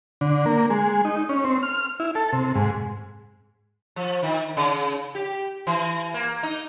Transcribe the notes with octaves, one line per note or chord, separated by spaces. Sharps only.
D3
A#3
G#3
D#4
C#4
C4
F6
E4
A4
C3
G#2
F3
D#3
C#3
G4
E3
A#3
D#4